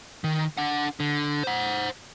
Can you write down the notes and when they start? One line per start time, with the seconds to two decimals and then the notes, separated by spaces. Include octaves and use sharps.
0.24 D#3
0.58 D4 F#5
1.00 D3
1.43 C5 F#5